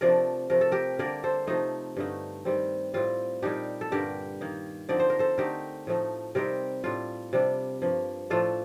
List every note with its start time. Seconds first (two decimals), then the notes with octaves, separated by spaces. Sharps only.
0.01 C3 F3 A3 D4 A#4 D5
0.50 C3 F3 A3 A#4
0.61 A4
0.72 G4 A#4
0.99 D3 G3 A#3 D4 A#4 D5
1.24 A4 C5
1.47 C3 F3 A3 D#4
1.97 G2 D3 A3 D#4
2.45 D#3 G3 C4
2.94 A2 G3 C4 F4
3.42 A#2 G3 D4 D#4 G4
3.81 A4
3.91 G2 D3 G3 D4 G4 A#4
4.41 D#3 A#3 D#4
4.89 D3 F3 C4 D#4 D5
4.99 C5
5.10 A#4
5.19 A4 C5
5.38 D3 A3 D#4 G4 A#4
5.87 A2 F3 A3 D#4
6.35 C3 G3 C4 D#4 G4 A#4
6.84 A2 G3 D4 F4
7.33 C3 G3 D4
7.82 G2 F3 A#3
8.30 A2 F3 A3 D4 F4 A4